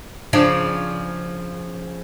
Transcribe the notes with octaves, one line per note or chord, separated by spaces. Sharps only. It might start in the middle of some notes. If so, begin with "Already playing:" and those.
C#3 F3 D4